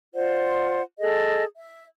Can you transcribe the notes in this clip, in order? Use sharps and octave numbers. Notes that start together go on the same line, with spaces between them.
F4 C5 D5 F#5
G#4 A4 D#5
E5